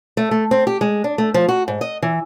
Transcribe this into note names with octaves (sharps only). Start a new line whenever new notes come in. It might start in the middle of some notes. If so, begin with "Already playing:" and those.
A3
A3
C4
G4
G#3
D4
A3
F3
F#4
G#2
D#5
E3